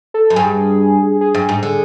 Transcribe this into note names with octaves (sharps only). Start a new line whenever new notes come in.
A4
F#2
G2 G#4
G#4
G2
G#2
D3